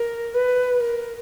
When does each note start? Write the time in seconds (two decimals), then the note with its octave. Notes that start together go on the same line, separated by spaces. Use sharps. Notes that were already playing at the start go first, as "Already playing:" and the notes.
Already playing: A#4
0.34 B4
0.80 A#4